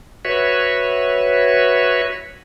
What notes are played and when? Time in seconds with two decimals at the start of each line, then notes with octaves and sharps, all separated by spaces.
0.25 F#4 B4 C#5 E5